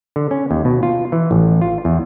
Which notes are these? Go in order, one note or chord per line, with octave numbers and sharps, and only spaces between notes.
D3
C#4
D#2
B2
F4
E3
A1
F4
E2